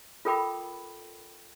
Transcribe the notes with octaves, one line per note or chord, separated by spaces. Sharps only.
F4 A4 A#4 G5 B5 D6